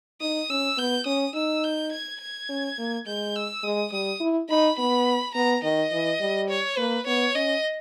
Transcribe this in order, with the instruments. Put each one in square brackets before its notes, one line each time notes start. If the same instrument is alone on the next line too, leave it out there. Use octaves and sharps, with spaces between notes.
[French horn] D#4 [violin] D#6
[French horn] C#4 [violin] E6
[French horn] B3 [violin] G6
[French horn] C#4 [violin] D#6
[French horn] D#4 [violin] E6
[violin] G6
G#6
G#6
[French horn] C#4
A#3
[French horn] G#3 [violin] G6
[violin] E6
[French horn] G#3 [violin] D#6
[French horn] G3 [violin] D#6
[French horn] E4
[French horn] D#4 [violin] B5
[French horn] B3 [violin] B5
[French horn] B3 [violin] A#5
[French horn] D#3 [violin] D#5
[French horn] E3
G3
[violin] C#5
[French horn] A#3 [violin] B4
[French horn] B3 [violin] C#5
[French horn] C#4 [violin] D#5